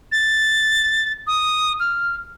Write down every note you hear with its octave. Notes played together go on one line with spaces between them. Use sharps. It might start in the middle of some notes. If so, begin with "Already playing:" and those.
A6
D#6
F6